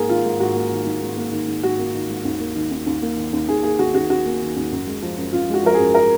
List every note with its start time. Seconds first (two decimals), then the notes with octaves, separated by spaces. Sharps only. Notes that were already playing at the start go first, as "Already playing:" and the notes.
Already playing: G#2 A#3 G#4 A#4
0.09 D#3 F4
0.25 G#2
0.40 G#2 F#4
0.56 A#3
0.71 D#3
0.86 G#2
1.02 G#2
1.17 A#3
1.32 D#3
1.48 G#2
1.63 G#2 F#4
1.79 A#3
1.94 D#3
2.09 G#2
2.25 D#2
2.40 A#3
2.55 D#3
2.71 D#2
2.87 D#2
3.02 A#3
3.17 D#3
3.33 D#2
3.48 D#2 G#4
3.63 A#3 G#4
3.79 D#3 F#4
3.94 D#2 F#4
4.10 D#2 F#4
4.25 A#3
4.41 D#3
4.56 D#2
4.72 F#2
4.87 G#3
5.02 F3
5.18 F#2
5.33 F#2 F4
5.49 G#3 F#4
5.63 F3 A#4
5.74 F#2 G#4
5.94 A#4